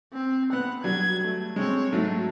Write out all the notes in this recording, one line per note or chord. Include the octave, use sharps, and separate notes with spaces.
C4
B3 F#5
F#3 G3 G#6
A3
G#3 C4 C#5
G#2 F#3 A3